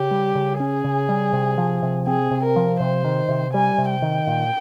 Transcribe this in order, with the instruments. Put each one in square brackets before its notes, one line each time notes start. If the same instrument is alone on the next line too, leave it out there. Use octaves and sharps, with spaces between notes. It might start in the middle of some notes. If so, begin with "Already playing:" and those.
Already playing: [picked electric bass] C#3 [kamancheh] G4
[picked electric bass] G3
C#3
[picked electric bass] C#4 [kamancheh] G#4
[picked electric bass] C#3
G3
C3
F3
C3
[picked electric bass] C4 [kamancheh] G#4
[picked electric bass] C3
[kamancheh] A#4
[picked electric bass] F3
[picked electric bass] C3 [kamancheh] C5
[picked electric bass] D#3
C3
[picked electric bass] G3 [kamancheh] G#5
[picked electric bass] C3
[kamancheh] G5
[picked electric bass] D#3
A#2